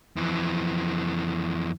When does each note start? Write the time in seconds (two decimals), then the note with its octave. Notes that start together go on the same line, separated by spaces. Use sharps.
0.16 F2 E3